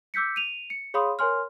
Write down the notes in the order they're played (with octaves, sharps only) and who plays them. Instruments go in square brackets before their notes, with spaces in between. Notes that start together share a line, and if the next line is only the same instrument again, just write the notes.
[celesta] D6 E6 G6 B6 C#7
D#7 F7
C#7
G#4 C#5 F5 B5 C6 D#6
A#4 C#5 G#5 C6 F6